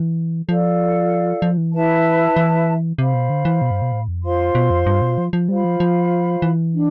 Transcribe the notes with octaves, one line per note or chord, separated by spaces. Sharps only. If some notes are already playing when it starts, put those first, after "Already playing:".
Already playing: E3
F3 F4 A4 D5 F5
F3
E3
E4 B4 E5 A5
E3
C3 C5 F5 B5
B2
D3
E3
B2
G2
B2
A2
F2
F4 C5 F5 C6
B2
F2
G2
B2
F3
F3
G3 F4 C5 F5 B5
F3
F3
E3
D4